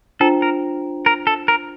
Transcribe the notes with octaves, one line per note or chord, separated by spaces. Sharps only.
D4 F4 A4 C5 G5 A#5
A#4
A#4
A4
A#4